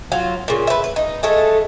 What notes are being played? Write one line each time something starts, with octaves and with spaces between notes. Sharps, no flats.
F#3 F4
A#2 C#3
B4 E5
B4
D#4
G#3 A3 A4